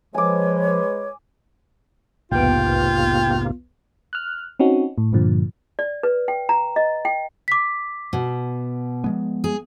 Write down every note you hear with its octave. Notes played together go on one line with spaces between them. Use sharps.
F3 G#3 B4 C#5 G#5 D6
B1 E2 G#2 C3 A#3 B3 F4 G5
F6 F#6
C4 C#4 D#4 F#4
A2
G2 A#2 D3 F3
D5
B4
G5
A#5
D#5
G5
D6 B6
B2
F3 G#3 B3
G#4